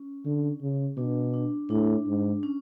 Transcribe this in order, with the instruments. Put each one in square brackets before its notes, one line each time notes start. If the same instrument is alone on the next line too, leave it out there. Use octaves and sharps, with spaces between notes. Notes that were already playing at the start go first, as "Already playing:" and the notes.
Already playing: [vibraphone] C#4
[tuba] D3
C#3
[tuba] B2 [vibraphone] D4
[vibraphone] D4
[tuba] A2 [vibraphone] D4
[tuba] G#2
[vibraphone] C#4